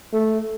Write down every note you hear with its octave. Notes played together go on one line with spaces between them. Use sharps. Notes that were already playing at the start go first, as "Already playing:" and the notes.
A3